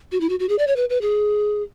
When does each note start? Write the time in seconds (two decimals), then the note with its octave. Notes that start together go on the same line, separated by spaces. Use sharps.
0.12 F#4
0.21 E4
0.29 F#4
0.40 F#4
0.49 G#4
0.59 D5
0.67 C#5
0.76 B4
0.90 B4
1.01 G#4